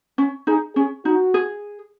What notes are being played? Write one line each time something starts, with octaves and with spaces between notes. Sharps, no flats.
C#4
D#4 G#4
C#4 G#4
D#4 F#4
G#4